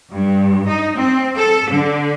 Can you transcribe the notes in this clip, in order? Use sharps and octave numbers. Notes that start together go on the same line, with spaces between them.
G2
D#4
C4
A4
D3